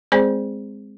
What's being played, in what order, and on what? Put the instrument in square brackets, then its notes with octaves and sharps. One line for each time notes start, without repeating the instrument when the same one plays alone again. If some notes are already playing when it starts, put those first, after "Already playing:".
[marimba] G#3 C4 G#4 C5 D5 G#5